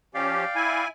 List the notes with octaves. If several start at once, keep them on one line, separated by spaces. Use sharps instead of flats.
F3 C#4 G4 D5 F5 G5
E4 G#5